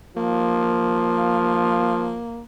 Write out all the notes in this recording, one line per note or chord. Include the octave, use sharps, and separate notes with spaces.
F3 A#3